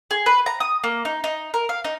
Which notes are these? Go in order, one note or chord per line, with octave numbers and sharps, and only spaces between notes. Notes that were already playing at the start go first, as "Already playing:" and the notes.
G#4
B4
A#5
D#6
A#3
D#4
D#4
A#4
F5
D#4